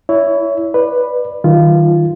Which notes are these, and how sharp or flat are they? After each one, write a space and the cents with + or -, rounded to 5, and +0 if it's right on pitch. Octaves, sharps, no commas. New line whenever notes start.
E4 +0 C#5 +25
B4 +0 D5 +25
D#3 +0 F#3 +40 F4 -15